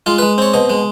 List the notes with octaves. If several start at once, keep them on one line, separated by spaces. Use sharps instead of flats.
G#3 F4
G#3 B4
C4 C#5
B2 D#5
G#3